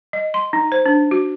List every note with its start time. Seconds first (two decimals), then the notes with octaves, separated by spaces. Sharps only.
0.13 D#5
0.34 C6
0.53 D#4
0.72 C5
0.86 D4
1.11 F#4